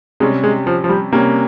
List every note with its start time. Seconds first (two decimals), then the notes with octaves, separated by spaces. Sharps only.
0.20 C3 G3 G#3 C#4
0.44 G#3
0.67 F3
0.84 F3
0.89 G3
1.12 C3 G3 A#3 C#4